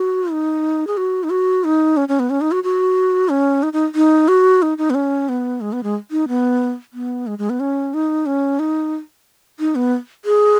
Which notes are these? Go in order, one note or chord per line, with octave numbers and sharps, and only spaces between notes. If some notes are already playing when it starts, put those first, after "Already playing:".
Already playing: F#4
D#4
G#4
F#4
D#4
F#4
D#4
C#4
C#4
B3
C#4
D#4
F#4
F#4
C#4
D#4
D#4
D#4
F#4
D#4
D#4
B3
C#4
B3
G#3
B3
G#3
D#4
B3
B3
G#3
G#3
B3
C#4
D#4
C#4
D#4
D#4
B3
G#4